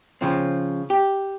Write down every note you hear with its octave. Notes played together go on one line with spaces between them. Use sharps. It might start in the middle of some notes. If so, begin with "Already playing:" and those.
C#3 F3 C4
G4